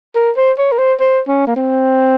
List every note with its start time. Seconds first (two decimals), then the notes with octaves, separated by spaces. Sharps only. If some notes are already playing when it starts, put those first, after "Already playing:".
0.16 A#4
0.37 C5
0.58 C#5
0.72 A#4
0.79 C5
1.00 C5
1.28 C#4
1.47 A#3
1.56 C4